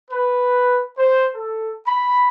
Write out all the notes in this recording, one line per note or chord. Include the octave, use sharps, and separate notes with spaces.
B4
C5
A4
B5